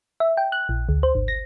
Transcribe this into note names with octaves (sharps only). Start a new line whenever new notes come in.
E5
G5
F#6
A#1
D2
C5
G#1
A#6